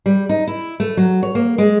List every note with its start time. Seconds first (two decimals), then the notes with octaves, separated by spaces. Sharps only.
0.06 G3
0.29 D#4
0.47 E4
0.80 A3
0.97 F#3
1.23 C#5
1.35 A#3
1.58 G#3